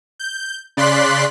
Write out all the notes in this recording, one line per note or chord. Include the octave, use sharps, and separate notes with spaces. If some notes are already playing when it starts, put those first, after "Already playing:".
G6
C#3 D5 C6 F#6 B6